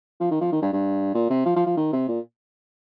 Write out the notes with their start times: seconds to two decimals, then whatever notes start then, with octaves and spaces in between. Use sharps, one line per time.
0.20 F3
0.31 D#3
0.41 F3
0.52 D#3
0.62 G2
0.73 G2
1.15 A#2
1.30 C3
1.45 F3
1.56 F3
1.66 F3
1.77 D#3
1.93 C3
2.08 A#2